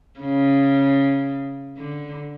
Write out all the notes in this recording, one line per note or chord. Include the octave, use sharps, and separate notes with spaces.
C#3
D3